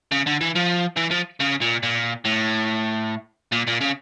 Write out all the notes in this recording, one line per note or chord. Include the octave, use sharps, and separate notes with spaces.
C#3
D3
E3
F3
E3
F3
C#3
A#2
A#2
A2
A#2
A#2
C#3